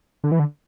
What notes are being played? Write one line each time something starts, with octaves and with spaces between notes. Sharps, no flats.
D3
E3
D3